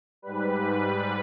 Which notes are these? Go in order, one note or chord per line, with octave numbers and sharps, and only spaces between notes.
G#2 G3 B4